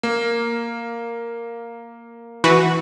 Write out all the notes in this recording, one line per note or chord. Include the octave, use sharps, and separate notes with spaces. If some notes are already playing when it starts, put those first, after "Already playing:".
A#3
E3 F#4 B4